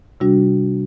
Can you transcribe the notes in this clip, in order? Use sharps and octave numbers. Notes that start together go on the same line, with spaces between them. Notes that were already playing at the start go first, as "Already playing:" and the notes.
C3 G3 D4 F#4